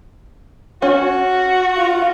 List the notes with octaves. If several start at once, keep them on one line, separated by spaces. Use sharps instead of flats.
C#4 F#4
F4